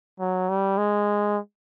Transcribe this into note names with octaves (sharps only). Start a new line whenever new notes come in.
F#3
G3
G#3